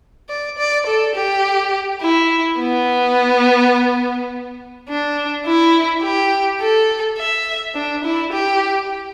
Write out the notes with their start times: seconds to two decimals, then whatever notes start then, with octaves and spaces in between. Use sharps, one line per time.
0.29 D5
0.58 D5
0.87 A4
1.15 G4
2.01 E4
2.59 B3
4.89 D4
5.46 E4
6.03 G4
6.61 A4
7.18 E5
7.75 D4
8.04 E4
8.32 G4